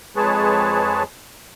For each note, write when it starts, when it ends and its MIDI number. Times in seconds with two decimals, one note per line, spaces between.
0.16 1.03 41
0.16 1.03 56
0.16 1.03 68
0.16 1.03 71
0.16 1.03 73
0.16 1.03 81